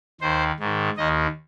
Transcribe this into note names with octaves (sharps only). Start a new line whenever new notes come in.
D#2 D#3 C5
G#2 D#3
D#2 D#3 D#5